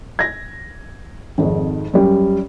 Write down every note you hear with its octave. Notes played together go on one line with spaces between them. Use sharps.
G#6 A#6
G#1 F2 G#2
F#2 G3